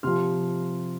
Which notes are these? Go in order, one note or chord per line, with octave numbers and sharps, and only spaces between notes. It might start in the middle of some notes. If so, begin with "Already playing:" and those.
C3 F3 C6 F6